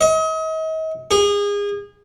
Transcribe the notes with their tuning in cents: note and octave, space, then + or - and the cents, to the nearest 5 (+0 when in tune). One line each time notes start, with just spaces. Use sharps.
D#5 +40
G#4 -30